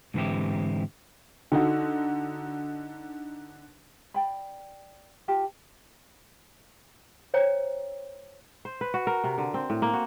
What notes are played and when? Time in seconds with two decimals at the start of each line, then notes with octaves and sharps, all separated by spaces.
0.14 G#2 D3 E3 C4 E4 G4
1.52 D3 D#4 F#4
4.14 D5 G5 B5
5.28 F4 G4 A5
7.34 C5 C#5 G5 A#5
8.65 C5
8.81 B4
8.94 F#4
9.07 A#4
9.24 C3
9.38 D3
9.54 C4
9.70 A2
9.82 A#3
9.93 F#4